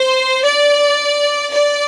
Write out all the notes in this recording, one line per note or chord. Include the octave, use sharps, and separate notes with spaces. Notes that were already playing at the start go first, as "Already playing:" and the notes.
Already playing: C5
D5
D5